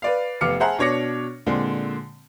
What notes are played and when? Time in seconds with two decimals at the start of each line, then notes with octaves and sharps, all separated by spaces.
0.02 B4 D5 F5
0.41 F1 B3 F5 D6 F6 C#7
0.60 G#4 C5 E5 F#5 A5 A#5
0.78 B2 D4 C#5 D6 A#6 C#7
1.46 A#2 D3 G#3 C4